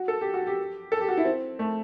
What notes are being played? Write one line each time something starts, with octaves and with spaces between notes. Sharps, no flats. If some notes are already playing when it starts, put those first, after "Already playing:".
Already playing: F#4
A4
G4
F#4
G4
A4
G4
F#4
E4
C4
A3